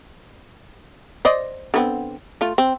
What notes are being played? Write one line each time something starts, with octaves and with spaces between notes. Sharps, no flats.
C5 D5 D#5
D3 B3 C4
A3 F4
C4